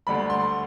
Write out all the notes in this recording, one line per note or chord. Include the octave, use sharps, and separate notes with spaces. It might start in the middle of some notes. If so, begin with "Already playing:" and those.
D2 D3 G3 B5
C6